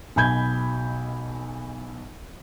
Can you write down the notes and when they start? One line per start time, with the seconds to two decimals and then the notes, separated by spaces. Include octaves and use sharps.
0.16 B1 B2 G#5 B5 G6 G#6